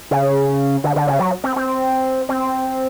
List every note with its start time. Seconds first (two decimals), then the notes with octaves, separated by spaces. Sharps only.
0.11 C#3
0.84 D3
0.96 D3
1.08 C#3
1.20 F#3
1.44 C4
1.56 C4
2.29 C4